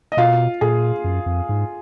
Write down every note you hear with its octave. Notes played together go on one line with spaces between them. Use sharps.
D#5
B2 F4 F5
A#2 G#4
F#2
F2
G#2